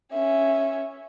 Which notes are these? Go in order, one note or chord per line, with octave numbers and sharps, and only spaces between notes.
C#4 E5